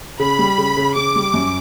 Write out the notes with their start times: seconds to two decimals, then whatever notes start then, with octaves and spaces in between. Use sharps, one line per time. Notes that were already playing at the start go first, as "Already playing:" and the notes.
0.20 C#3 B5
0.39 G3
0.58 C#3
0.77 C#3
0.96 C#3 D6
1.16 G3
1.34 F#2